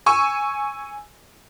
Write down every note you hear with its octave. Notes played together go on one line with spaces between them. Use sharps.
G#5 C#6 E6